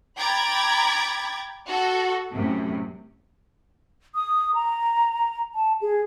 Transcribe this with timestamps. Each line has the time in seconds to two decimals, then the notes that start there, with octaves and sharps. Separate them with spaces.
0.19 G5 A#5 B5 D6 G#6 A6
1.66 F#4 A4
2.33 F#2 A2 C3
4.15 D#6
4.54 A#5
5.55 A5
5.81 G#4